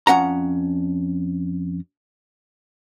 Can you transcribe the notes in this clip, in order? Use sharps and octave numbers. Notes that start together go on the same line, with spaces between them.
F2 C#4 F#5 A#5